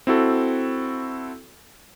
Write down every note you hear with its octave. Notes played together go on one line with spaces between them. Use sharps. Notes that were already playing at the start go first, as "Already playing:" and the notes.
C4 E4 F#4 A4